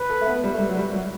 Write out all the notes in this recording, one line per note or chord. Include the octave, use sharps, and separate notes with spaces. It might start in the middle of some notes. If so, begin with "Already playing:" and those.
Already playing: B4
A4
A3
B3
G3
A3
G3
F#3
G3
F#3